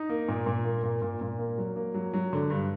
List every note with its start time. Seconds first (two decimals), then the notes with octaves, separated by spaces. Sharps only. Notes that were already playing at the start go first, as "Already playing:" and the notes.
Already playing: D#4
0.09 A#3
0.28 A#2
0.46 A#2
0.64 A#3
0.83 A#2
1.02 A#2
1.21 A#2
1.39 A#3
1.58 F#3
1.76 A#3
1.94 F#3
2.13 F#3
2.33 D3
2.50 G2